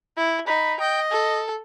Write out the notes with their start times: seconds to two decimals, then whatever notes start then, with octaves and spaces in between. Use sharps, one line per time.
0.17 E4
0.47 D#4 B5
0.80 D#5 G5
1.11 A4